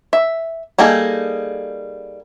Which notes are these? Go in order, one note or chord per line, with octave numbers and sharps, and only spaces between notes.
E5
G3 A#3 D#4 G#4 A4